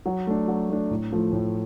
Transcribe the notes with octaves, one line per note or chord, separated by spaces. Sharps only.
F#3
A3 D4
F#3
A3 D4
A2
F3 A3
A2